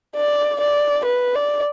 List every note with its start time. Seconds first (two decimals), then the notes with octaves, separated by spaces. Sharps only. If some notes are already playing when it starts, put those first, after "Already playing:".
0.16 D5
0.61 D5
1.05 B4
1.35 D5